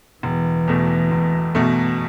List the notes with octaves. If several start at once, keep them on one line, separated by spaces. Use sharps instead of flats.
E1 E3
E2 B2 A3
E1
E2 B2 A3